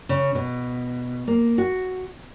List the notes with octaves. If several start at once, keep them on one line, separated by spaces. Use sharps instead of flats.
C#3
B2
A#3
F#4